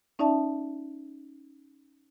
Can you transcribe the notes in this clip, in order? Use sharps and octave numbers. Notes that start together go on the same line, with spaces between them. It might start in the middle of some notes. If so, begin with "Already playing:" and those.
C#4 D#4 D5 E5 A5